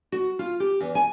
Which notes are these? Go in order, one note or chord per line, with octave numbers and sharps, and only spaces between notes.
F#4
F4
G4
E2
G#5